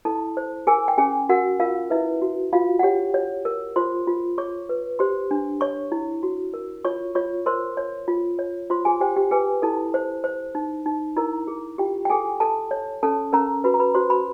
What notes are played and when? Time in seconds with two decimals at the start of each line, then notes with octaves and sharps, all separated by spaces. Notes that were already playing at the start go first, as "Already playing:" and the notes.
0.05 E4 A4 A5
0.37 C5
0.67 G#4 A#4 G#5
0.88 G5
0.98 C#4 G#4 G#5
1.29 F#4 A#4 F#5
1.60 F4 A#4 F5
1.90 E4 B4 E5
2.22 F#4
2.53 F4 F#4 F5
2.79 F#5
2.83 G4 C#5 G5
3.14 C#5
3.45 A#4
3.76 F4 C5 C6
4.07 F4
4.38 G#4 C#5 C#6
4.69 B4
4.99 G4 C5 C6
5.31 D4
5.61 C#5 C#6
5.92 E4
6.23 F#4
6.54 A#4
6.85 F4 C#5 C#6
7.15 F4 C#5 C#6
7.46 A#4 C5 C6
7.77 C#5
8.08 F4
8.39 C#5
8.70 F4 C5 C6
8.85 G#4 G#5
9.00 G4 C5 G5
9.16 G4 G5
9.31 G#4 B4 G#5
9.62 E4 A4 A5
9.94 C5
10.24 C5
10.55 D#4
10.86 D#4
11.16 E4 A#4 A#5
11.47 G#4
11.78 F4 G4 G5
12.05 G5
12.10 G#4 A4 G#5
12.40 A4 A5
12.71 C#5
13.03 C#4 A4 A5
13.33 C#4 A#4 A#5
13.64 F#4 B4 B5
13.74 A#5
13.79 B4 B5
13.95 F#4 C5 C6
14.10 B4 B5